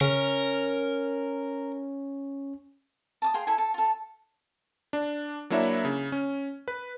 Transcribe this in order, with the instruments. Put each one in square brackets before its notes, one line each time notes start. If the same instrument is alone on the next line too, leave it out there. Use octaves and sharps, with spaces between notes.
[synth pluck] C#3 [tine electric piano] C#4 [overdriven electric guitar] A#4
[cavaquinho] A5 D6 D#6
G#4 F5 G5 C6
E4 A4 G#5
A4
F4 A4
[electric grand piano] D4
F#3 A#3 D4 E4 C#5 E5
C#3
C#4
B4